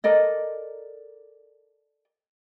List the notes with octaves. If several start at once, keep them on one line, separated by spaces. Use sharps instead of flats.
A4 A#4 D5 D#5